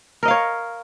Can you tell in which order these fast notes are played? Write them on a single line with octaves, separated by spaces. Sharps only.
A#4 D#5 F5 C#5